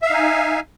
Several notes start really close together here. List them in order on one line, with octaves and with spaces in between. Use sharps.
E5 F5 D#4 G#5